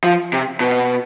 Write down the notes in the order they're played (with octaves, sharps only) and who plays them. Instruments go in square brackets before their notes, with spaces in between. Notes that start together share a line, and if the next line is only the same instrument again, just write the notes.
[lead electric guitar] F3
C3
B2